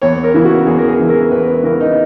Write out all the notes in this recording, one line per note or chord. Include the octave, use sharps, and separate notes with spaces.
E2 C#5
A#4
C#3 E3 E4
F#4
E2 G#4
A#4
G#4
C#3 E3
A#4
E2 B4
B4
C#3 E3 A#4
D#4